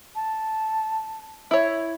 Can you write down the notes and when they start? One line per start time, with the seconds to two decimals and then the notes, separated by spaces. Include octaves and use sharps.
0.15 A5
1.51 E4 C#5 E5